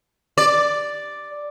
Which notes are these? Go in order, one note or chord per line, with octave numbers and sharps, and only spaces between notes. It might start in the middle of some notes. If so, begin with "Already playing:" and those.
D5